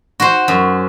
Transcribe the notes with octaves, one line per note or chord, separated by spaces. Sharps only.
F#4 C5
F#2